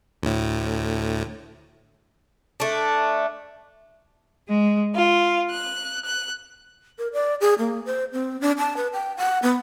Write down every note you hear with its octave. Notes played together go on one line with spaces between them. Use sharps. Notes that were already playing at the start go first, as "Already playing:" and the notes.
D2 A2
A3 D4
G#3
F4
F#6
F#6
A#4
D5
G#4
A#3
C5
C4
D4
A5
B4
G5
F#5
B3